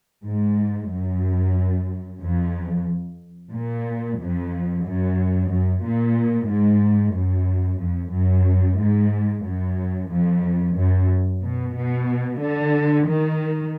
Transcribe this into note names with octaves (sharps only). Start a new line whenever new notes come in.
G#2
F#2
F2
A#2
F2
F#2
F#2
A#2
G#2
F#2
F2
F#2
G#2
F#2
F2
F#2
B2
B2
D3
D#3